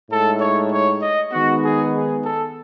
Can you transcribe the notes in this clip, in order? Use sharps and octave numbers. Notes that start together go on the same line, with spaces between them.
A2 G#3 D#4 A4
C#5
C#5
D#5
D#3 G#3 B3 D#4 F#4
G#4
G#4
A4